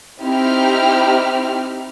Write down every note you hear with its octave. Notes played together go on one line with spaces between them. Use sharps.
C4 D#4 E4 G4 F6